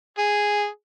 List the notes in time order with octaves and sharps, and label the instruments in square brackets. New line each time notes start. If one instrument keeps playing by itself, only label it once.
[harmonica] G#4